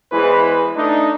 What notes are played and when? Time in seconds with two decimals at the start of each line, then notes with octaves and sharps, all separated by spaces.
0.12 E2 E3 G#3 B4 C5
0.76 A3 D4 D#4